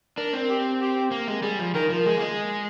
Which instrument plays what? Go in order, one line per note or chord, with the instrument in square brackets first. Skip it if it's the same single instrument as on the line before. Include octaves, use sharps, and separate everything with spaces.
[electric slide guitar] D4 [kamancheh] A#4
[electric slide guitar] C4
[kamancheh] G4
G4
[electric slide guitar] A#3
G#3
[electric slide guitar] G3 [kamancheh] G#4
[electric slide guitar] F3
[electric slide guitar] D#3 [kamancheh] A#4
[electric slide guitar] F3
[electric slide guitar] G#3 [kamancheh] G#4
[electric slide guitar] A#3
G#3